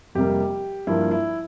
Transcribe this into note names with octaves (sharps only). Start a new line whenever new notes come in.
F2 C3 G3 A#3 G4
G2 F3 A#3 E4
E4